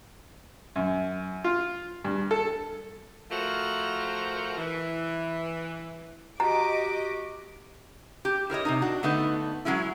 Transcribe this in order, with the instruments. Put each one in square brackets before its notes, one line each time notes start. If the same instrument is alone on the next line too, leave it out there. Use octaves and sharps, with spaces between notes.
[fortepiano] F#2
F4
G2
A4
[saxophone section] F3 A3 F#4 A#4 C5
E3
[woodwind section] F#4 G4 [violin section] D#5 D6 [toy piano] A#5
[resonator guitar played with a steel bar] G4
E4 A#4 C#5 D#5
C3 G#3 D#4
D4 F#4
D3 A3 B3 D#4
F#3 G#3 C#4 E4